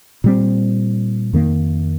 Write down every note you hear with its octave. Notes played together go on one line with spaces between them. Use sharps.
A#2 G3 C4
F2 D#3 A#3